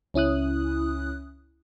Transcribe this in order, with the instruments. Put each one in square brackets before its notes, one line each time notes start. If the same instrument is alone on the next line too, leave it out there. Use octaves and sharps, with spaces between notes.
[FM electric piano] C#2 C#4 E4 D#6 F#6